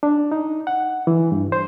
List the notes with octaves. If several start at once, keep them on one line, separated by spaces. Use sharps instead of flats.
D4
D#4
F#5
E3
G2
C5